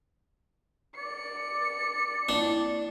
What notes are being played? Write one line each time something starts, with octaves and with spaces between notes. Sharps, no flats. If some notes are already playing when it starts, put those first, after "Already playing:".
D5 C#7
A#3 C4 D4 E4